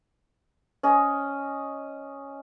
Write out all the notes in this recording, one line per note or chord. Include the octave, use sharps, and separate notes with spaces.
C#4 D#5